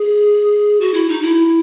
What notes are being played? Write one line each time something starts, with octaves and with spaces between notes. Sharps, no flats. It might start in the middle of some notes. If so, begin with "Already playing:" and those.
Already playing: G#4
F#4
E4
D#4
E4